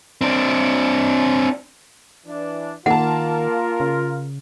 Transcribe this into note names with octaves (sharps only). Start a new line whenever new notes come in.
C4 D4
E3 D4
D#3 A#3 F4 A#4 F#5 A5
C#3